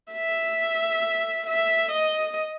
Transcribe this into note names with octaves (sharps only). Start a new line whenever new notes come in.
E5
E5
D#5